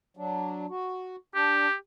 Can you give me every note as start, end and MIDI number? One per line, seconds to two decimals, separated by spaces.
0.17 0.66 54
0.17 0.66 62
0.69 1.16 66
1.35 1.66 62
1.35 1.74 67